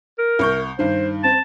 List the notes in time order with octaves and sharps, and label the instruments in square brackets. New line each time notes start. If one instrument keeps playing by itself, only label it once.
[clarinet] A#4
[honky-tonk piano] C2 C#6 G6
[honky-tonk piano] G2 D#3 [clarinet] C5
[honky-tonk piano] C4 C5 [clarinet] A5